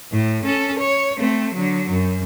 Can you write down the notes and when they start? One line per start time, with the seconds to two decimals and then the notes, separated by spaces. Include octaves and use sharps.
0.12 A2
0.45 C#4 A4
0.79 C#5
1.19 A3 C4
1.54 D3 F#3
1.90 F#2